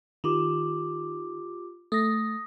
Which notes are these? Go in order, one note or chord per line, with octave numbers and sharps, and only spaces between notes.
D#3 F4 G4 D6
A3 D#6 A#6